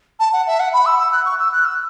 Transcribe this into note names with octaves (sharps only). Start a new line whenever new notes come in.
A5
F#5
E5
F#5
B5
E6
E6
F#6
C#6
E6
F#6
E6